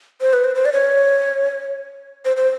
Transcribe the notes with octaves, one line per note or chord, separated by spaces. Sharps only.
C5
B4
C5
C5
D5
C#5
C5
C5